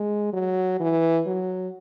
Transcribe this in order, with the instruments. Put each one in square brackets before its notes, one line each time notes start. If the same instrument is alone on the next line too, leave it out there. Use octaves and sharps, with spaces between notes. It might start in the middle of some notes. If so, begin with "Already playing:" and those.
Already playing: [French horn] G#3
F#3
E3
F#3